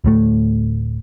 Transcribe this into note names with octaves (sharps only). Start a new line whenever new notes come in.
D1 A2 A3